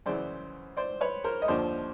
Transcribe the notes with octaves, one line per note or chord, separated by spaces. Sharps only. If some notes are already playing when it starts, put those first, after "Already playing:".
F#2 C#3 E3 C5 D5
C5 D5
B4 C#5
A#4 C5
D#5
D#2 D3 F3 C5 D5